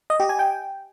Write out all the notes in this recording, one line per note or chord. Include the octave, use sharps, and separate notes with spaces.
D#5
G4
G#5
G5